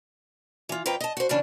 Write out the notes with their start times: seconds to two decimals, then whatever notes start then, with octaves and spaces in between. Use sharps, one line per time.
0.69 E3 F4
0.86 F2 F3 B4 G5 A#5
1.00 D#5 A5
1.17 F#4 C5
1.29 C#3 E3 C#4 D4